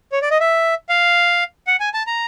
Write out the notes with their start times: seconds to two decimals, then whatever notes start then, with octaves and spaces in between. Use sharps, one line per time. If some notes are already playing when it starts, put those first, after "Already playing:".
0.12 C#5
0.22 D5
0.31 D#5
0.40 E5
0.89 F5
1.67 F#5
1.80 G#5
1.94 A5
2.07 A#5